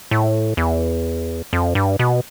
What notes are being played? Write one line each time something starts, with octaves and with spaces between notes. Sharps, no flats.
A2
E2
F2
G2
B2